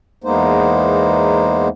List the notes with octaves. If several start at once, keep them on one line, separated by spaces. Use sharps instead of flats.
E2 G#3 A#3 B3 D#4 C5